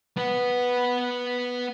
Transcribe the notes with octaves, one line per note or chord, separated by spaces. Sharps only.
B3 B4